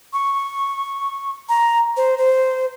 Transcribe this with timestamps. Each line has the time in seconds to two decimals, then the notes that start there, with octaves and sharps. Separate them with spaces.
0.13 C#6
1.49 A#5
1.97 C5
2.18 C5